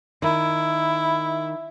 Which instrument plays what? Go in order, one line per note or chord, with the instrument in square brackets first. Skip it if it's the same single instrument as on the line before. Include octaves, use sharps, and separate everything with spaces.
[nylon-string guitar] D#3 [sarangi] E4